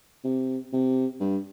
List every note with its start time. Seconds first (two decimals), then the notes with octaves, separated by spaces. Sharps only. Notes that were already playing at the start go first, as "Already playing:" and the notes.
0.24 C3
0.73 C3
1.20 G2